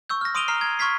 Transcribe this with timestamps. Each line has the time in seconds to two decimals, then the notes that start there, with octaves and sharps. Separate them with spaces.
0.10 C#6 E6 G6
0.21 F6 A#6
0.35 C6 D#6 D7 D#7 F7 G7
0.48 A#5 F6 C7
0.61 G#6
0.79 C6 C#6 F6 G#6 B6 C7